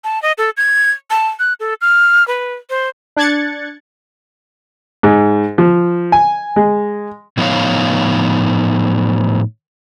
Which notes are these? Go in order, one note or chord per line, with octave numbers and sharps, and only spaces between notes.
A5
D#5
A4
G#6
A5
F#6
A4
F6
B4
C5
D4 F#6 G#6 A6 C#7
G#2
F3
G#5
G#3
A2 F3 B3 D#4 C#5 F5